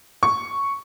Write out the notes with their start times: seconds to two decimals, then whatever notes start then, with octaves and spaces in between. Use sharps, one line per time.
0.23 C#6